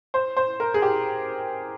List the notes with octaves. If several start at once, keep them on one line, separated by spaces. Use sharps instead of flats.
C5
C5
A#4
G#4
G4